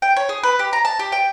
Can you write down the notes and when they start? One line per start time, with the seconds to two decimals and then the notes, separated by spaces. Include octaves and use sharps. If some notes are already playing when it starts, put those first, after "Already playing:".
0.02 G5
0.16 C#5
0.29 G#4
0.43 B4
0.59 G4
0.73 A#5
0.85 A5
0.99 G4
1.12 G5